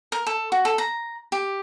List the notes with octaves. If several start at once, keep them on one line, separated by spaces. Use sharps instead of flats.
A#4
A4
F#4
A4
A#5
G4